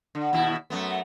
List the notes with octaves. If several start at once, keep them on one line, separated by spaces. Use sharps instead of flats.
D3
D#2 B2 E4
F#2 A3 B3